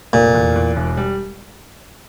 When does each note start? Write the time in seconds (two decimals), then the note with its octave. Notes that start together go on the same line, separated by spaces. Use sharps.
0.13 F1 A#2
0.34 E2
0.56 E2
0.76 E1
0.97 G3